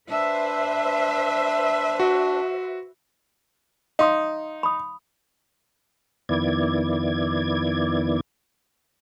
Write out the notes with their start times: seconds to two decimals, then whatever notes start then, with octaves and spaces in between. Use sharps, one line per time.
0.10 D4 B4 C5 E5
1.99 F#4
3.99 D#4 F5 C6 D#6
4.63 B5 D#6
6.29 F2 D#3 B3 E4 D5 G#6